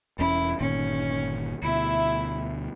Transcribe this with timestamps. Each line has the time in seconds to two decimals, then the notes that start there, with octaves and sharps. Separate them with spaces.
0.19 E1 E2 C#4 E4
0.61 G1 A#2 D#3 C#4
1.62 D2 B2 E4 E5